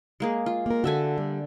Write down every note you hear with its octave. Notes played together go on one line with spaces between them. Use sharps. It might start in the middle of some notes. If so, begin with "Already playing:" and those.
G#3 A#3 G#4
F4
A#3 A#4
D3 F#4 A4 E5 G#5
G3